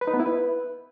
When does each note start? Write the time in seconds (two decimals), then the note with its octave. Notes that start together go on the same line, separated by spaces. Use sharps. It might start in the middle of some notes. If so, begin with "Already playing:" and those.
0.01 B4
0.07 D#4
0.14 B3
0.20 E4
0.26 B4